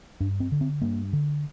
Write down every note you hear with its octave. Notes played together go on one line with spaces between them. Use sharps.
G2 D4
C4
D3
C4
G2 A#3
D3